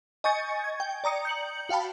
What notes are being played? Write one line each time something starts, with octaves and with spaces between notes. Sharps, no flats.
D#5 G#5 C#6 G6 A6 C#7
G#6
G5
D5 A#5 D#6 C#7
G6 C#7 F#7
F#4 F5 G5 A5 B5